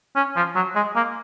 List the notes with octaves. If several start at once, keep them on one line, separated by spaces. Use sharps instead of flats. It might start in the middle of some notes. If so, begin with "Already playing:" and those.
C#4
F3
F#3
G#3
A#3